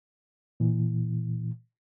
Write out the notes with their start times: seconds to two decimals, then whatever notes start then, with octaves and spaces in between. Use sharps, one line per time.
0.60 A#2 E3